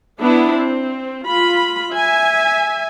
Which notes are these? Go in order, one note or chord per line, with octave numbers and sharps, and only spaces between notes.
B3 D4 E4
C4
F4 B5
E5 G#5